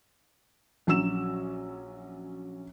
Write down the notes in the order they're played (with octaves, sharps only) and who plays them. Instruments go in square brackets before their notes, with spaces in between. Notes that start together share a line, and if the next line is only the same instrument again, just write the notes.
[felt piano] A#1 F#3 C#4 F#4 E6 E7